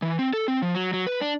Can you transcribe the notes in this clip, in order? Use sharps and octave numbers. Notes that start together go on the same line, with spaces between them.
E3
C4
A4
C4
F3
F#3
F#3
B4
D4